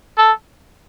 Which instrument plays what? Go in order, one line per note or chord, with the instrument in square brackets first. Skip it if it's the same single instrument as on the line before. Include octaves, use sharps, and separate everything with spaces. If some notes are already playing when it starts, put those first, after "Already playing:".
[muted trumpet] A4